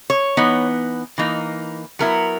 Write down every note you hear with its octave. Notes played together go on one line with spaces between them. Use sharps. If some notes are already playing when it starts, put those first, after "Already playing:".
C#5
E3 B3 D#4
E3 A#3 D#4
F#3 B3 E4 A#4